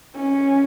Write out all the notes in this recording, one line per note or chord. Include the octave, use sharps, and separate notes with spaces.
C#4